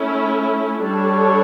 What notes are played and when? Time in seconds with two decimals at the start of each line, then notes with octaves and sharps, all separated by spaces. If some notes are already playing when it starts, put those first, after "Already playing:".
Already playing: A3 C#4 E4
0.81 G3 D4 A4 C#5